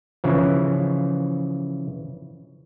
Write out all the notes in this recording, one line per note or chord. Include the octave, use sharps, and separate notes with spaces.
C#3 E3 F3